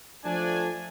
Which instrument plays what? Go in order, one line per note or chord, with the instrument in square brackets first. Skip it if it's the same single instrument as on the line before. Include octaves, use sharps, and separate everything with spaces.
[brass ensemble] F3 A3 D4 G#5